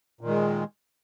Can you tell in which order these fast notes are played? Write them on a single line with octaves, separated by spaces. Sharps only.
A#2 D#3 G#3